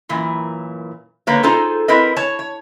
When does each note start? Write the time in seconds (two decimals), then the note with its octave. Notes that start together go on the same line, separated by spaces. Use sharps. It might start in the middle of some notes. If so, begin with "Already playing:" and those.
0.09 F#2 A#2 E3
1.27 D3 A#3 B4 C#5
1.43 D#4 F4 G#4 A4 C5
1.88 C4 E4 A#4 B4 D#5
2.17 C#5 A5
2.39 C#5